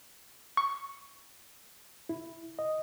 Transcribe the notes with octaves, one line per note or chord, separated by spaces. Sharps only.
C#6
E4
D#5